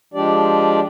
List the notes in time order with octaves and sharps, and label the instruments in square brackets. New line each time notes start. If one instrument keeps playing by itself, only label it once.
[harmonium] F3 G#3 D4 G4 D5